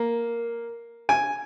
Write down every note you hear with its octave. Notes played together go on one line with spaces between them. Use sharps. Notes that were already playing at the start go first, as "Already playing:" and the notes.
Already playing: A#3
G#5